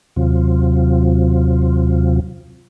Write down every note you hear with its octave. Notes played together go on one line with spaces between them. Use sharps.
D#2 C3 F#3 C4 F4